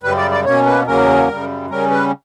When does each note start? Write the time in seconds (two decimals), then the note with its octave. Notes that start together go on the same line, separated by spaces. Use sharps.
0.03 F#2 C#3 G3 B4
0.17 D5
0.31 D5
0.45 B2 A#3 C#4 C#5
0.66 B4
0.87 E2 C#3 F#3 A#3 C#4 A#4
1.28 F#2 C#3 G3
1.70 C#3 G3 C#4 A#4
1.91 B4